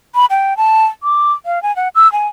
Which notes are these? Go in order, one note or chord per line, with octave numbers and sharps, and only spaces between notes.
B5
G5
A5
D6
F5
G#5
F#5
E6
G#5